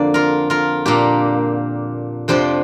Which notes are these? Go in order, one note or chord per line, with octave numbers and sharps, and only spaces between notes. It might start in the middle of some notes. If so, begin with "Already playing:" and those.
Already playing: F2 D3 A#3 D4 D5
F4 A#4
F4 A#4
A#2 A#3 D4 G4
F2 C3 F3 D4 G4 C5